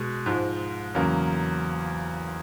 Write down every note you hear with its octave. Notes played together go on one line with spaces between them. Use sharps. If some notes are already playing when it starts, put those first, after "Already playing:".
Already playing: B2 G#3
G#2 F3 G#3
E2 C#3 F#3 A#3